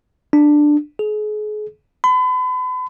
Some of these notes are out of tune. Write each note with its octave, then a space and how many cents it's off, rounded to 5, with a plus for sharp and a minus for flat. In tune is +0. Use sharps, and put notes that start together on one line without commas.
D4 +10
G#4 +35
B5 +40